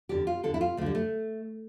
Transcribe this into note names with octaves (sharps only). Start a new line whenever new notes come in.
E2 D3 G4
F4
E2 D3 A4
E4
F4
D2 D3 G3 A3
A3